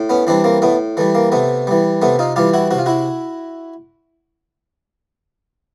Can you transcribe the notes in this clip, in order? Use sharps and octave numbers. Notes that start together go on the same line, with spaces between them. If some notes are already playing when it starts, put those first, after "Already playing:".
Already playing: A2
B3 C#4
E3 G3 C4 D4
A#3 C4
A2 A3 B3
E3 G3 A3
A#3
C3 A3 B3
E3 G3
C3 A3 B3
D#4 F4
E3 G3 F4 G4
E4 F#4
C3 F#4
F4
E4 F#4